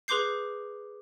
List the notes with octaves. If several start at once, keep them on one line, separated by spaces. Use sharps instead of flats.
G#4 B4 C6 D6 G6 C7